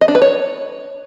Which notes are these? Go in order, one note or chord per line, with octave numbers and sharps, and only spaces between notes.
D#5
D4
B4
C#5